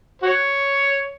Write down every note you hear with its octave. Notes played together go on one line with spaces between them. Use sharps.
F#4 C#5